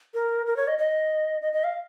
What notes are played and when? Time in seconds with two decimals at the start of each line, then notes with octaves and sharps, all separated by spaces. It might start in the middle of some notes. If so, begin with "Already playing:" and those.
0.14 A#4
0.46 A#4
0.57 C#5
0.68 D#5
0.78 D#5
1.42 D#5
1.53 D#5
1.64 F5